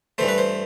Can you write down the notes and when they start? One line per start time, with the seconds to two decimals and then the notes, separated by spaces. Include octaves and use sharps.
0.18 G2 E3 A3 C5
0.28 B4
0.38 C5